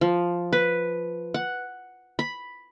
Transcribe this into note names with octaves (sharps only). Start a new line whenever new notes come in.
F3
B4
F#5
B5